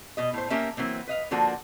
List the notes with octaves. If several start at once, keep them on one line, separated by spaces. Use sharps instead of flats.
B2 D#5
A2 C5
A#3 C#4 G4 A#4 E5 G#5
E3 F#3 A#3 C4
B4 D#5 F5
D3 F3 A#3 D4 F#4